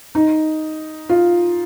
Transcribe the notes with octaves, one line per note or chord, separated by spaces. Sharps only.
D#4
F4